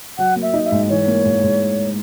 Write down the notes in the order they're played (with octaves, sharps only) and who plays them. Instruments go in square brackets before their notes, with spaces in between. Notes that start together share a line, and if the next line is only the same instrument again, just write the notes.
[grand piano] F#3 [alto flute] F#5
[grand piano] A#3
[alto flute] E5
[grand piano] D#4
[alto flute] E5
[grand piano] G#2
[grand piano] E3 [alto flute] C#5
[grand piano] A#3
G#2
G#2